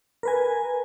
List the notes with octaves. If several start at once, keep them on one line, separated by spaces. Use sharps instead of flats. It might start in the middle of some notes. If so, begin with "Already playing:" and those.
A#4 B4 G#5